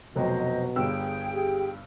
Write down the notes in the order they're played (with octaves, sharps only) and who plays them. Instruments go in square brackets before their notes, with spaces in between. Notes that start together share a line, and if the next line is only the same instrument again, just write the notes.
[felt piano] F1 F#3 G5 [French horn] B2 [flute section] C5 D#5
[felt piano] G1 G2 E6 [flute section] G#4 G5
[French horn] G4